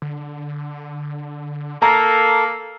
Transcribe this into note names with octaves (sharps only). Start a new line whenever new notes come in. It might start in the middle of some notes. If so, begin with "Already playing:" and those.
D3
A#3 A4 A#5